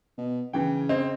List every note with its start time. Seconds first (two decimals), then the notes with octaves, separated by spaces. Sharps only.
0.18 B2
0.53 C#3 E3 G5
0.89 C4 D#5